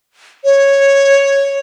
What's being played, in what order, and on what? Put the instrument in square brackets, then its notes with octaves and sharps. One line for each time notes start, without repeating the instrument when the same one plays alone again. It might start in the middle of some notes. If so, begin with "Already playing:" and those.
[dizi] C#5